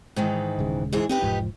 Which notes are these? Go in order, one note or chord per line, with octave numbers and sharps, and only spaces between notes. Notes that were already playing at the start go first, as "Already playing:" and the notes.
G#2 D#3 E3
D#1 C#3 G#3
G#2 E3 G#4
C4 D#4 G4 B4
E1 G#2 F3